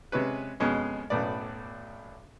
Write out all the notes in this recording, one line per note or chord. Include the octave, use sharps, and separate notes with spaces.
C3 G#3 C#4 B4
F2 B2 G#3 C#4
B1 F#2 A2 B3 D5